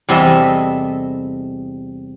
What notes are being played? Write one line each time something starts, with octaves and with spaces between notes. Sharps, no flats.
E2 C3 G3 A4 D#5 E5